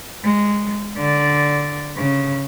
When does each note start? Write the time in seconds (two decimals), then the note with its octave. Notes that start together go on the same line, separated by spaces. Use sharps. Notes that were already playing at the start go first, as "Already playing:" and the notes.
0.24 G#3
0.97 D3 D5
1.96 C#3